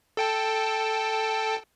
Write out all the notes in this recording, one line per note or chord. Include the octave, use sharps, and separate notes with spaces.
A4 G5 A5